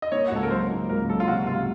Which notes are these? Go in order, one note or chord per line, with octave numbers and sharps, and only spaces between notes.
D#5
A#3 C#5
F#4
C#2 A4
A#4
F#3 C5
A#3
C#2 A#4
F#3 A4
F4
C3 F#4
C#2 F4